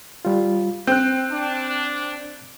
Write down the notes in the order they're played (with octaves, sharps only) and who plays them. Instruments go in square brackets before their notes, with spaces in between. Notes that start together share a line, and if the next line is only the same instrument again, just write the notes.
[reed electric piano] G3 F4
[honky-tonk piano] C4 [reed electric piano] F#6 G6
[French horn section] D4